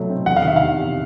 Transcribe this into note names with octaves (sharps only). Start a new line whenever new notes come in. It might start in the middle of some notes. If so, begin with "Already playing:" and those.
Already playing: B2 F#3 A3
C4
E2 F#5
F5
D#3 E5
F5
C3
E2